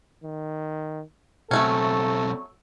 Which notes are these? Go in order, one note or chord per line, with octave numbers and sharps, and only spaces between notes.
D#3
B1 F#3 A3 C4 C#4 A4